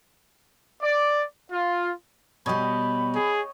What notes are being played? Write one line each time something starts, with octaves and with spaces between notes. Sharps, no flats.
D5
F4
B2 G3 C#5 D#5 G5 B5
G#4